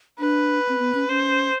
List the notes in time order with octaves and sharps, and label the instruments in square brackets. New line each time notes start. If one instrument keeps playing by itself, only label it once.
[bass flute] D4 [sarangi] B4
[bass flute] C4
B3
C#4
[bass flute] C#4 [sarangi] C5